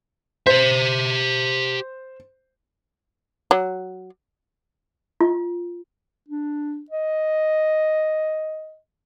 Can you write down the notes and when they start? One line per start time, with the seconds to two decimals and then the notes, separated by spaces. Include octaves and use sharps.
0.47 G4 C5 E5
3.51 F#3
5.21 F4
6.28 D4
6.90 D#5